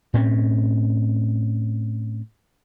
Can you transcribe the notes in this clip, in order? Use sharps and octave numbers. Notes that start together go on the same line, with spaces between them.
A2 C4 C#4